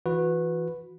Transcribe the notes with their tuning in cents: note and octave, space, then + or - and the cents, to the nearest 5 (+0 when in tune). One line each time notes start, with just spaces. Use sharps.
E3 +0 F#4 -25 B4 +0